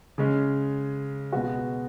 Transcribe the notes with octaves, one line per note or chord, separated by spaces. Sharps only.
C#3 G#3 C#4
B2 G#3 B3 F#4